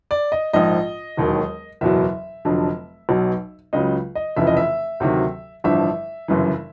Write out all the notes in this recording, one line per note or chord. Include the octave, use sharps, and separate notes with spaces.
D5
D#5
A#1 G#2 F3 D#5
E1 D#2 D#3 F#3
F#1 E2 B2 F#3 E5
F1 F2 D3 F#3
B1 B2 F#3
C#2 C#3 F#3 D#5
D#5
F1 F2 C#3 E3 E5
D#5
E5
D2 C3 D#3 F#3
A1 G2 D3 F3 E5
G1 F#2 C#3 E3